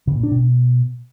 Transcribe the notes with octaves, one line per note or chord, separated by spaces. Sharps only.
C#3
A#2
D4
B2